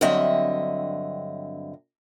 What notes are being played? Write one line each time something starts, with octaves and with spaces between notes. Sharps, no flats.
G2 D3 F#3 C4 D#5 E5